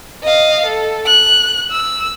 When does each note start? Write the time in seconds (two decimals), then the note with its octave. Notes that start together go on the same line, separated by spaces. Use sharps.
0.24 D#5 F5
0.66 A4
1.06 F#6
1.71 E6